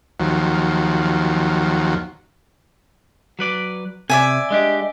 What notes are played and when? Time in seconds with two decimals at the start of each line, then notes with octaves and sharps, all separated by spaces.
0.20 D#2 F3 F#3
3.39 F#3 B4 D5
4.10 C3 D5 E5 G#5
4.50 G#3 D4 G4 D#5